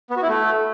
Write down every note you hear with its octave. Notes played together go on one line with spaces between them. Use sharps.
B3
F#4
E4
A3